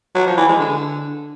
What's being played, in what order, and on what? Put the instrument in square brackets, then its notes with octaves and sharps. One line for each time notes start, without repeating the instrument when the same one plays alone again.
[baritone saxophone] F#3
F3
E3
G#3
D3